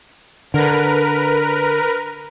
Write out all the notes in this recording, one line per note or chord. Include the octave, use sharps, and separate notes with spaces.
D3 A#4 B4